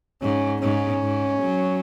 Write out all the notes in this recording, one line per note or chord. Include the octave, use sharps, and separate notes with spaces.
G#2 C#4
G#2 C#4
G#2
F#3